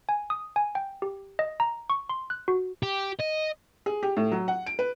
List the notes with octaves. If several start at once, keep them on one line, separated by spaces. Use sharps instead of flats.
G#5
D#6
G#5
G5
G4
D#5
A#5
C#6
C6
F#6
F#4
G4
D#5
G#4
G4
A2
F#3
F#5
D7
B4